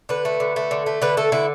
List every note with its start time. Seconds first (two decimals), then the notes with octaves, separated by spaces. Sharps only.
0.09 D3 B4
0.25 A3
0.40 D3
0.56 A3
0.71 D3
0.86 A3
1.02 D3 B4
1.17 A3 A4
1.32 D3 E4